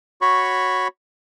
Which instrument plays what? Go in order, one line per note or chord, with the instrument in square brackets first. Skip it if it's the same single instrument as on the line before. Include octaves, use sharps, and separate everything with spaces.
[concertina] F#4 C#5 B5 C#6